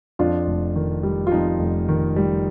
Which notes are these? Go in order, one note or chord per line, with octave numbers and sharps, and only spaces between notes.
F2 D4 F4
F1
D#3
G3
F4
F2 D#4
F1
D#3
G3